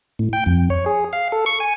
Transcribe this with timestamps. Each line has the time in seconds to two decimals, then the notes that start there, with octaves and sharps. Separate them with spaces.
0.19 A2
0.33 G5
0.46 F2
0.70 C#5
0.86 G#4
1.13 F5
1.32 A4
1.46 C#6
1.60 G#5